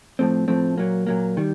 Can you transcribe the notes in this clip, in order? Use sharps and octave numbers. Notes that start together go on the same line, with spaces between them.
A2 F3 A3 C4
A2 F3 A3 C4
A#2 F#3 A#3
A#2 F#3 A#3
D#3 G3